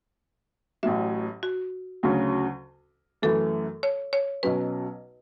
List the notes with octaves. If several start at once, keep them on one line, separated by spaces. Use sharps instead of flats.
A1 A2 F#3 E5
F#4
D2 C#3 F#3 C#4
F#2 E3 A3 A4
C#5
C#5
B1 B2 F#3 C#4 B4